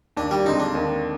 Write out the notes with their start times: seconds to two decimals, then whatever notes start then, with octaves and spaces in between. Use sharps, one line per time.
0.17 D#2 D4
0.31 G3
0.45 D3 G#3 C4 D#4
0.60 D4
0.75 D#2